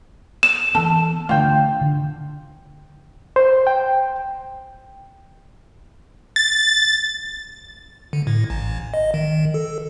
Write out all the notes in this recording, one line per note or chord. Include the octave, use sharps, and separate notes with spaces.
E7
E3 B3 A4
D3 A3 F4 G5
D3
C5
G5
A6
D3
A2
A1
D#5
D#3
A4